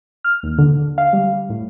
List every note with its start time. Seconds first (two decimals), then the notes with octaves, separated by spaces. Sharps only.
0.24 F6
0.43 D#2
0.58 D3
0.98 F5
1.13 G3
1.50 A2